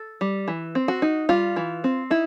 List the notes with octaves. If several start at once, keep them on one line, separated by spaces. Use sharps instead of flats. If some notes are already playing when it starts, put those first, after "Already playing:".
Already playing: A4
G3
E3
C4
F#4
D#4
G3 F4
E3
C4
D#4 E4